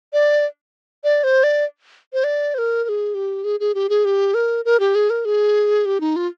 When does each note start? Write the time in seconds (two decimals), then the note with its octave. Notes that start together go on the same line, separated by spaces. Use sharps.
0.13 D5
1.04 D5
1.24 C5
1.44 D5
2.13 C5
2.24 D5
2.54 C5
2.58 A#4
2.84 A#4
2.89 G#4
3.14 G4
3.44 G#4
3.60 G#4
3.75 G4
3.89 G#4
4.05 G4
4.34 A#4
4.65 A#4
4.80 G4
4.95 G#4
5.10 A#4
5.25 G#4
5.85 G4
6.01 D#4
6.16 F4